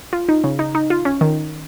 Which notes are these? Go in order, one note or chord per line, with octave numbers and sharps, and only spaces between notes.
F4
D#4
C#3
D#4
D#4
F4
C#4
D#3